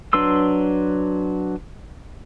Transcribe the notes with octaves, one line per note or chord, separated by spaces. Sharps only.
F#3 D4 B4 C6 E6